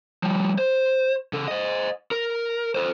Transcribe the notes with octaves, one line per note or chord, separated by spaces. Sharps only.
F3 G3
C5
C#3 A4
C5 D#5
A#4
A4 C5